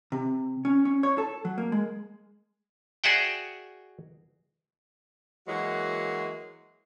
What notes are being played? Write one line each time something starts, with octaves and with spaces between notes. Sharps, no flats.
C3
C#4
C#4
C#5
A4
F#3
A#3
G#3
F#4 G#4 D5 E5 F#5 G5
E3 F#3 G#3 A#3 F#4